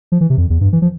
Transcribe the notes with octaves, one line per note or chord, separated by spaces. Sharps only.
F3
E3
C3
F2
E2
G2
E3
F3